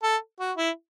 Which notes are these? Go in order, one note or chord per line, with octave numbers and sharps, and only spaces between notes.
A4
F#4
E4